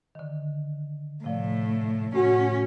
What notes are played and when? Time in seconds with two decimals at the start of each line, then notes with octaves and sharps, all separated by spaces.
0.15 D3 D#3
1.24 A2 C3 F3 D5
2.15 A2 A3 C#4 F#4